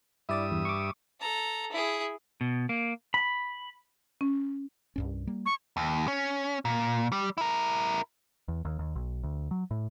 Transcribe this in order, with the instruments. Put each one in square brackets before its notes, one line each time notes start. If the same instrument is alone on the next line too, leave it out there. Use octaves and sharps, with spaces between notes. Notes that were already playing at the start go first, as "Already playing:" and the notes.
[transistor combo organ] G2 E5 D#6 [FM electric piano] E4 D5 D6
[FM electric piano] E2
C#6 D6
[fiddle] A4 A#5
E4 G#4
[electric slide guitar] B2
A#3
[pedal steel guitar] B5
[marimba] C#4
[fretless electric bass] C2 G2 C#4
G3 A#3
[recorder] C#6
[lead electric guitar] D#2
C#4
A#2
G3
E4 A#4
[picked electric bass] E2
D#2
D#2
B1
D2
F#3
A2